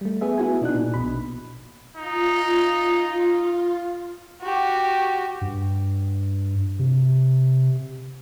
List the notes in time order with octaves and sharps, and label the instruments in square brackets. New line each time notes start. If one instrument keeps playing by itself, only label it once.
[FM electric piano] G3 A3
B3 G#4 E5
B3 E4 F#4 G#5
B2 D4 D#4 F#6
A#2
A#1 B2 B5
[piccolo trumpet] D#4 [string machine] F4
[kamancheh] F#4 G4
[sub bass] G2
C3